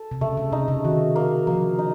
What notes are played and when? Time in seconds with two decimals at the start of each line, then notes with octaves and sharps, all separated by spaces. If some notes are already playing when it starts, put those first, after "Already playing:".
Already playing: A4
0.11 C3
0.21 C#3 A3
0.37 C#3
0.52 C3 D#4
0.68 C#3
0.84 D#3 F#4
1.16 A#3
1.47 F3 A#3
1.79 D#4